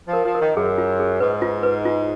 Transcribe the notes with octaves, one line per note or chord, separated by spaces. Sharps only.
F3
A#4
F3
A#4
D#3
F#2 G#4
F4
G#4
G#2 B4
F4
B4
F4